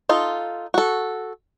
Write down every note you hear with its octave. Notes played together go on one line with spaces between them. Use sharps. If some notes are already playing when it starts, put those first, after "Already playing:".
D#4 F4 A4
F#4 A4